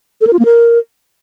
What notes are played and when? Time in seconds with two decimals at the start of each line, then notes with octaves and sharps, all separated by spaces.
0.21 A4
0.27 A#4
0.33 F4
0.39 A#3
0.45 A#4